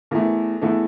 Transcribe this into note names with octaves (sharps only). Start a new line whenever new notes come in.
E2 E3 A3 A#4
E2 E3 A3 A4